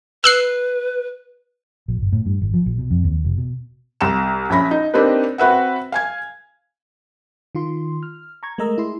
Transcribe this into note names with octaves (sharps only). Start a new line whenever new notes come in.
B4 E6 F#6 C7
A#1
G1
A2
G2
G#1
F3
A#1
B2
F2
D#2
F1
B2
C2 A#5 E7
A#1 C#4 E5 B5 A#6
D#4
A#3 C4 D4 D#4 G4 B4
C4 F#4 B4 E5 F#5
F5 G#5 G#6
D#3 F4 C6
F6
A#5 C#6 G#6
G#3 A3 A#4 D#5 A#5 E6
E4 G#4 C6